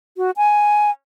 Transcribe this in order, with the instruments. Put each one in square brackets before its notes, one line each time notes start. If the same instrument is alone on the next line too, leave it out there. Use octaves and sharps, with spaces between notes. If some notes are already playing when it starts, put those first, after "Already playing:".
[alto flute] F#4
G#5